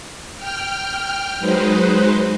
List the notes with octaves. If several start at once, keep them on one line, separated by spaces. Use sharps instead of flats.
G5 F6
F#3 G#3 D#4 B4 C5